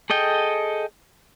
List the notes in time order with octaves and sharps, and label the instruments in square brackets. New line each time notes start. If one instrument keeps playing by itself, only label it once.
[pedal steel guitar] G#4 A4 D#5 G5